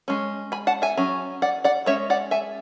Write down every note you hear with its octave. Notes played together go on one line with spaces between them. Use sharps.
G#3 C#4
G#5 B5
F#5 A5
E5 G#5
F#3 C#4
D5 F#5
D5 F#5
G#3 C#4 C#5 E5
D5 F#5
E5 G#5